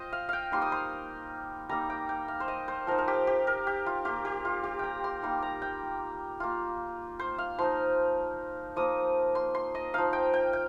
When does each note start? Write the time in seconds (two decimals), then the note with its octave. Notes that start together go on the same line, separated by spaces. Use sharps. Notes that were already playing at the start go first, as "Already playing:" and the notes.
Already playing: F4 C5 D#5 G5
0.12 F5
0.29 F5 G5
0.52 G3 A#3 D#4 C6
0.62 D#6
0.72 C6
1.69 G3 A#3 D#4 A#5
1.90 G5
2.09 G5
2.28 F5
2.40 C5
2.48 D#5
2.68 C5
2.87 F3 D#4 A#4
2.98 A#4
3.08 G4
3.27 G4
3.47 A#4
3.67 G4
3.86 F4
4.05 A#3 F4 G4
4.25 G4
4.45 F4
4.64 G4
4.79 G5 A#5
5.04 C6
5.22 G3 A#3 D#4 C6
5.43 A#5
5.62 G5
6.40 A#3 F4
7.19 C5
7.38 F5
7.58 F3 D#4 C6
8.76 F3 A#3 D#4 D#6
9.35 C6
9.55 C6
9.75 D#5
9.94 F3 D#4 F5
10.13 G5
10.34 G5
10.53 G5